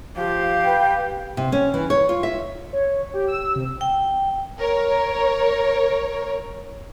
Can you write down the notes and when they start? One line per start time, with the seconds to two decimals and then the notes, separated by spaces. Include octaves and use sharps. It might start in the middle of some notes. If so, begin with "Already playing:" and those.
0.17 F3 G4 F5
0.65 B4 G5
1.37 C3
1.52 C#4
1.74 E3
1.90 C#5
2.09 F4
2.23 E5
2.73 C#5
3.14 G4
3.27 E6
3.55 C3
3.81 G5
4.61 A#4 C#5